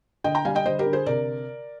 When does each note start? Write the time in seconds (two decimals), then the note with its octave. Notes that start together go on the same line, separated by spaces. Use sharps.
0.24 D3 D#5 G5
0.35 G5 A#5
0.45 G3 F5 G#5
0.55 D#5 G5
0.65 D3 C5 D#5
0.79 G4 A#4
0.86 D3
0.93 G#4 C5
1.06 C3 A#4 D5